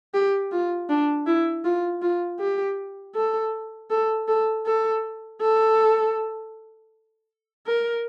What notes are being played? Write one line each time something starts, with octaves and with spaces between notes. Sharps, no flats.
G4
F4
D4
E4
F4
F4
G4
A4
A4
A4
A4
A4
A#4